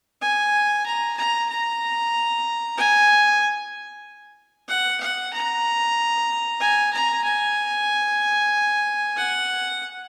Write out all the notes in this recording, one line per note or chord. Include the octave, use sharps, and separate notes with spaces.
G#5
A#5
A#5
A#5
G#5
F#5
F#5
A#5
G#5
A#5
G#5
F#5